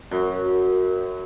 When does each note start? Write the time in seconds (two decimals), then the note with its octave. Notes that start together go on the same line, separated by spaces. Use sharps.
0.11 F#2